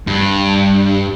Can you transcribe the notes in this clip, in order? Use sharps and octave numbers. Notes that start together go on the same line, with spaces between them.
G2